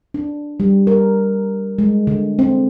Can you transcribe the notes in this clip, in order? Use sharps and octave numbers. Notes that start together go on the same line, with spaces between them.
D4
G3
A#4
G#3
D3
C4